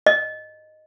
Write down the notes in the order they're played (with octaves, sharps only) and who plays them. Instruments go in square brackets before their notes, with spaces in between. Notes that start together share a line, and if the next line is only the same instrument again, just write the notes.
[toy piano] D#5